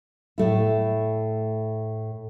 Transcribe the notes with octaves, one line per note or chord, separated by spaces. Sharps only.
A2 A3 E4